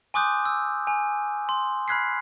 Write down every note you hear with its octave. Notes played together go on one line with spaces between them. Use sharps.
G#5 C6 D6 D#6 F#6 G6
E6
G#5
C6
B5 F6 F#6 G#6 B6 C7